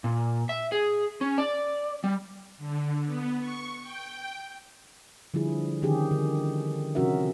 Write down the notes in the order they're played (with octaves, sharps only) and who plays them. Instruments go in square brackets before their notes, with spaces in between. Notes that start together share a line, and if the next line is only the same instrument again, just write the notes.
[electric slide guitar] A#2
E5
G#4
C#4
D5
G3
[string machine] D3
B3
C#6
G5
[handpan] D3 F3 G3 E4 G#4
D3 D#3 C#4 G4 G#4
D3
C3 F3 C#4 F#4 A#4 E5